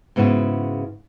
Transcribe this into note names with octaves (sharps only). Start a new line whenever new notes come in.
G#2 C#3 B3 E4 F#4